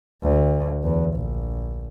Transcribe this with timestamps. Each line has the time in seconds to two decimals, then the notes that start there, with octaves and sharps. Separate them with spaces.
0.23 D2
0.83 E2
1.15 A#1